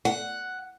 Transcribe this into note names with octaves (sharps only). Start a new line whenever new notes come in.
F#5